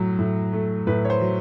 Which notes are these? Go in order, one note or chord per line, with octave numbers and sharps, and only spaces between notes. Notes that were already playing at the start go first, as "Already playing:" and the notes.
Already playing: A2 F#3
A2
A3
A2 B4
C#5
C5
F#3